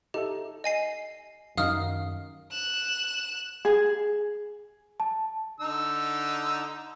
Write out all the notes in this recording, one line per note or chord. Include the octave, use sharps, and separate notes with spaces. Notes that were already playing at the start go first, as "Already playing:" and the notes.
D#4 G4 A4 E5
D#5 G#5 C7
F#2 D#3 D#4 F5 D#6 F6
F#6 E7
G#4
A5
D3 D#4 E6